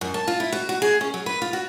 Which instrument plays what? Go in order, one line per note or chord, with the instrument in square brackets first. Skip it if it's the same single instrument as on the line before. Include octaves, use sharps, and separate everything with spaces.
[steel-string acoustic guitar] F#2
A5
F4
E4
F#4
F#4
G#4
C#4
F#3
B4
F4
F#4